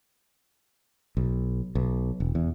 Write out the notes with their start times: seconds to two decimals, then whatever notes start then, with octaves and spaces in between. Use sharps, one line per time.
1.17 B1
1.75 B1
2.20 E1
2.35 E2